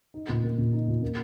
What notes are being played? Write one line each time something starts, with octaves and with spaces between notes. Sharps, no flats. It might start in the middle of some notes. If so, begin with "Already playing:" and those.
D#4
A#2
A#3
A#2
D#4
A#2
A#3